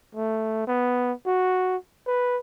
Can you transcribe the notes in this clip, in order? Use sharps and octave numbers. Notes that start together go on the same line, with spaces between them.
A3
B3
F#4
B4